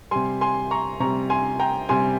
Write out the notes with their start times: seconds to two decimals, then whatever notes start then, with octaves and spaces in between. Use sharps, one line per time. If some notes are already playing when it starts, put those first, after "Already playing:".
0.11 C3 G3 G#5 C6
0.41 G#5 C6
0.71 A#5 C#6
1.00 C3 G3 A#5 C#6
1.30 G#5 C6
1.60 G5 A#5
1.89 C3 G3 G#5 C6